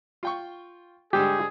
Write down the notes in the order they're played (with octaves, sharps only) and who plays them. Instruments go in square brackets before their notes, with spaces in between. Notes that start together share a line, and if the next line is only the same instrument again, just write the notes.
[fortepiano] F4 G5 C#6
[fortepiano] G#2 D3 G3 [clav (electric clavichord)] G4 [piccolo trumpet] G#4